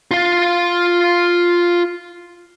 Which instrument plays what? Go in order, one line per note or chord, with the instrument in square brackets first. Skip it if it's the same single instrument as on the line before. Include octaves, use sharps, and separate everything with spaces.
[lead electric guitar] F4 F5